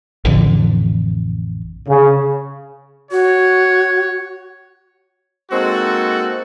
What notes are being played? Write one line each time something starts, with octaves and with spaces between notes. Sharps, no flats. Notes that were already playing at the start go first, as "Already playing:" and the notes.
A1 F2 D3
C#3
F#4 C#5
G#3 A#3 C4 D#4 F#4 A4